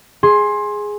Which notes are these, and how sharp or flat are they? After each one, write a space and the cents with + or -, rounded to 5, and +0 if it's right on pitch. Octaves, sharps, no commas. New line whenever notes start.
G#4 +0 C6 +20